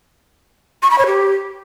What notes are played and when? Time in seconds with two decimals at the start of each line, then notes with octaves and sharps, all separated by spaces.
0.83 C#6
0.91 B5
0.99 C#5
1.06 G4